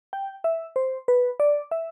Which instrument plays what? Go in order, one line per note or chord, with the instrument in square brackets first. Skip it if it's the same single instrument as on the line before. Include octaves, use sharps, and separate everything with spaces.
[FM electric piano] G5
E5
C5
B4
D5
E5